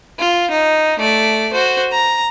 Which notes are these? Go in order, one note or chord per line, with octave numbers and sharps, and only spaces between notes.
F4
D#4
A3 D5
F#4 C5
A#5